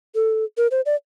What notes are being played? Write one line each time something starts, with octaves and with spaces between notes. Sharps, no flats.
A4
A#4
C5
D5